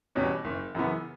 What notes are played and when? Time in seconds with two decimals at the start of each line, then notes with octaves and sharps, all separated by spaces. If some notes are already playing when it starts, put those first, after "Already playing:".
0.15 E2 B2 G3 C#4
0.45 F#1
0.75 F#2 C#3 E3 B3